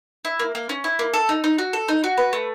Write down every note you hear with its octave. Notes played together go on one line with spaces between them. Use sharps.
E4
A#3
A#3
C#4
E4
A#3
A4
D#4
D#4
F#4
A4
D#4
F#4
B4
A3